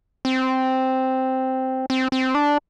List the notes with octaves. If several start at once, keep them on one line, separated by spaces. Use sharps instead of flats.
C4
C4
C4
D4